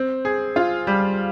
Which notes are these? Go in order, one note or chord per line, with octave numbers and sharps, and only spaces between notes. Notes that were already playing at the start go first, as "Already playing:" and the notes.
Already playing: C4
G#4
F4
G3